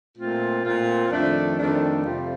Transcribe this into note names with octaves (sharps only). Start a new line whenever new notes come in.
A#2 A3 C4 F4
A#2 A3 C4 F4
F2 D#3 A3 D4
F2 D#3 A3 D4
F2 C3 G3 C4 F4